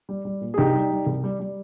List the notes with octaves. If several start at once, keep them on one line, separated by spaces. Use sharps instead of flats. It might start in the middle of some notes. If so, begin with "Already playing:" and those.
G3
G3
A#2
G#4
C2 D#4 G4
G3
G3
C2
G3
G3